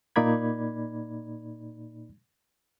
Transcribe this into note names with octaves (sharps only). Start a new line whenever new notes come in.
A#2 A#3 D#4 D5 B5 G#6